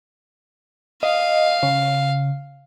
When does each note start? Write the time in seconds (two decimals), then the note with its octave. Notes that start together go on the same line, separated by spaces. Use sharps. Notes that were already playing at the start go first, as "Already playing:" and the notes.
1.03 D#5 F5
1.63 C#3